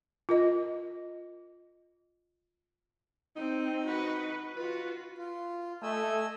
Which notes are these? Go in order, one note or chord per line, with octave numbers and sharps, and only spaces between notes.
F4 A#4 D#5
C4 D#4
F#4 B4
F4 F#4 B4
F4
A3 D#5 G#5 E6